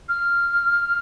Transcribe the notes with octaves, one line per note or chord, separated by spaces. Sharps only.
F6